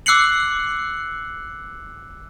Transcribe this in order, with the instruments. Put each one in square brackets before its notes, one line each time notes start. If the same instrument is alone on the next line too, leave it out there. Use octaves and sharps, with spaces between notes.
[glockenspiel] D6 E6 F#6 C7 C#7 F#7